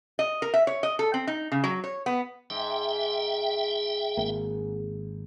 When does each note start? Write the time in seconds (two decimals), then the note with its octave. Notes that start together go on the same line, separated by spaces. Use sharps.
0.19 D#5
0.42 A#4
0.54 E5
0.67 C#5
0.83 D#5
0.99 A4
1.14 C4
1.27 D#4
1.52 C#3
1.64 F#3
1.84 C#5
2.06 B3
2.50 G#2 E5 G5
4.17 G#1 A#3